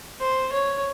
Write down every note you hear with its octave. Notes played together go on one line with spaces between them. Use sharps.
C5
C#5